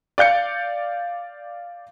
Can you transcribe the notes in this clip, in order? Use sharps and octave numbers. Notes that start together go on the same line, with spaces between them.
D5 F5 G6 C#7